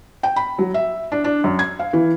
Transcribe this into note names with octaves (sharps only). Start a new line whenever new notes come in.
G5
B5
F#3
E5
D4
D4
F#2
G#6
F5
E3